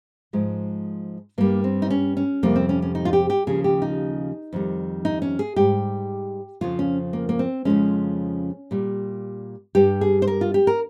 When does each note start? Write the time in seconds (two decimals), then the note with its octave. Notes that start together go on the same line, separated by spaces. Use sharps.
0.33 G#2 F3 G#3
1.38 G2 G3 A#3
1.64 C4
1.82 D#4
1.90 C#4
2.17 C#4
2.43 F2 C3 G3 A#3
2.56 C4
2.69 C#4
2.82 C#4
2.95 D#4
3.05 F4
3.13 G4
3.30 G4
3.47 D#2 C#3 F3 G#4
3.64 G4
3.82 D#4
4.53 F2 D#3 G3
5.05 D#4
5.22 C#4
5.39 G#4
5.56 G#2 G3 G4
6.61 F2 C#3 F3 F4
6.79 C#4
7.13 A#3
7.29 A#3
7.39 C4
7.65 F2 C#3 F3 G#3 C#4
8.71 A#2 G3
9.75 G2 G3 G4
10.01 G#4
10.22 C5
10.27 A#4
10.41 F4
10.54 G4
10.67 A#4